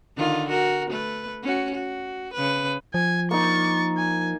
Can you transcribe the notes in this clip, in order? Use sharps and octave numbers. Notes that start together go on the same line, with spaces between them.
D3 D#3 F4
F#4 A#4
A3 B4
C#4 F#4
F#4
C#3 B4
F3 G#5
A#3 D#4 C#6 A6
G#5